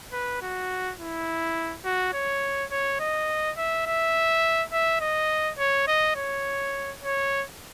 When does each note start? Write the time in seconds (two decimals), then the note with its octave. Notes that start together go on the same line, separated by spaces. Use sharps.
0.13 B4
0.41 F#4
0.99 E4
1.85 F#4
2.13 C#5
2.71 C#5
3.00 D#5
3.57 E5
3.86 E5
4.72 E5
5.01 D#5
5.58 C#5
5.87 D#5
6.16 C#5
7.02 C#5